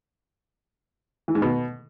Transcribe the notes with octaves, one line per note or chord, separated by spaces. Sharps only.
E3
G#2
B2